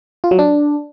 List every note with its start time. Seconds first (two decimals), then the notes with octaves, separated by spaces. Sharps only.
0.24 F4
0.31 F#3
0.39 D4